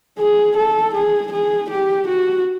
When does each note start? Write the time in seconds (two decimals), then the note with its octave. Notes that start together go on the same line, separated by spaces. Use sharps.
0.19 G#4
0.57 A4
0.94 G#4
1.32 G#4
1.70 G4
2.07 F#4